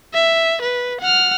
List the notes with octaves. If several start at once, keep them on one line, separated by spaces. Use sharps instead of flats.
E5
B4
F#5 F6